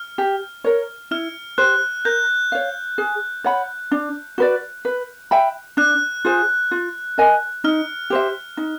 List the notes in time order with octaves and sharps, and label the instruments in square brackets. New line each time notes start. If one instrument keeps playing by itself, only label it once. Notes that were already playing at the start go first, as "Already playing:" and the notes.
Already playing: [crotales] F6
[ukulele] G4
A#4 C#5
[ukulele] E4 [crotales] F6
[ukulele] G4 C5 [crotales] F#6
[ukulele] A#4 [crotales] G6
[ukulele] C#5 F5
G#4
C#5 F#5 B5
D4
F#4 B4 D5
B4
E5 G5 B5
[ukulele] D4 [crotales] F#6
[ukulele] F4 G#4 C5
F4
A#4 D#5 G#5
[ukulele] D#4 [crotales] F6
[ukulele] G4 C5 E5
D#4